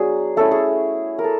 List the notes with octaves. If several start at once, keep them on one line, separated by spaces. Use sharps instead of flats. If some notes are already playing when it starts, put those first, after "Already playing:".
Already playing: F#3 B3 D4 G#4
A3 C#4 E4 A4
G#4
A#4
A4